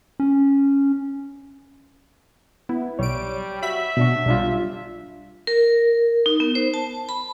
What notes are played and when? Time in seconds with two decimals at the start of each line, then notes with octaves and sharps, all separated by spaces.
0.20 C#4
2.69 B3 E4
2.99 B1 G3 C#5 D7
3.62 F#4 E5 B5 B6
3.97 B2 D4 F#4
4.26 B1 G3 D4 F4
5.47 A#4
6.26 D#4
6.40 B3
6.55 C5
6.74 A5
7.09 B5